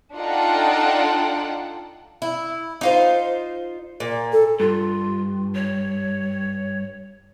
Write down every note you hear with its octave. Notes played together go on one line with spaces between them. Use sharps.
D4 D#4 F4 A4 F#5 G5
E4
D#4 F4 C5
A#2
A4
G2 F4
C#5